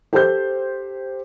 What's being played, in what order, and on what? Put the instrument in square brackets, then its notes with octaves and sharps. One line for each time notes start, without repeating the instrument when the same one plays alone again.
[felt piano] G4 A4 C5 G6